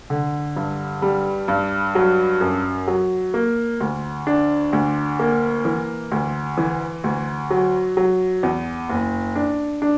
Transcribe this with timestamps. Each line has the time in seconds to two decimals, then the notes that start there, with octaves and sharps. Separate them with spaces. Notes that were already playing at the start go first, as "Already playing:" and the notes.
0.10 D3
0.56 G2
1.02 G3
1.48 G2
1.95 F#3
2.41 F#2
2.88 F#3
3.34 A#3
3.81 D2
4.27 D4
4.73 D2
5.19 A#3
5.65 E3
6.12 D2
6.58 E3
7.04 D2
7.50 F#3
7.97 F#3
8.43 E2
8.89 F#1
9.35 D4
9.82 D4